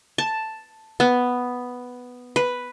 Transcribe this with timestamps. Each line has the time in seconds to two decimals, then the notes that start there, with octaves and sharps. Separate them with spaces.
0.18 A5
1.00 B3
2.36 B4